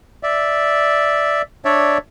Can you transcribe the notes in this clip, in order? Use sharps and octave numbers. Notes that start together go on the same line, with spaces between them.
D5 E5
D4 C#5 D5 E5